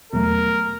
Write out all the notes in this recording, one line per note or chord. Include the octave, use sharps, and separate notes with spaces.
E2 B2 F#3 A3 A#4